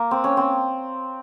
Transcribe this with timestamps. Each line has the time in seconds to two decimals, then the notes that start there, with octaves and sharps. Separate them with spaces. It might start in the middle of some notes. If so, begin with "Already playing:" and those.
Already playing: A#3
0.11 C4
0.24 C#4
0.37 C4